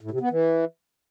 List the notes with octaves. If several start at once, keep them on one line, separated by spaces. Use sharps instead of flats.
A2
C3
B3
E3